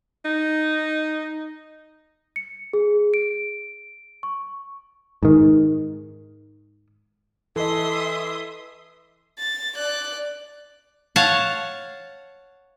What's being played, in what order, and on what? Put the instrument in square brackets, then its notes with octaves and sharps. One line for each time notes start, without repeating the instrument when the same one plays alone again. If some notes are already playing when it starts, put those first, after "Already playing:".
[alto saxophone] D#4
[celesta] C#7
G#4
D7
C#6
[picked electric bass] G#2 D#3
[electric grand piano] E3 [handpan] A4 D#5 [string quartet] E5 C6 D#6
[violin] A6
D5 F#6
[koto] C#5 F5 F#5 A5